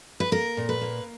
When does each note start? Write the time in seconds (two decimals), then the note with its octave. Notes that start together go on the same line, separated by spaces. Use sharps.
0.20 B4
0.32 A#3 A#4
0.57 A#2
0.69 B4
0.81 A#3